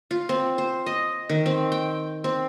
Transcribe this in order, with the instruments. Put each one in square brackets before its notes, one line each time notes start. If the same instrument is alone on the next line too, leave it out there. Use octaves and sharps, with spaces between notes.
[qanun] F4
C4
C5
D#5
D#3
C4
G5
C4